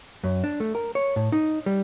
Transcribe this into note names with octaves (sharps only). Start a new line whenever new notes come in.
F#2
D4
A3
A#4
C#5
A2
D#4
G3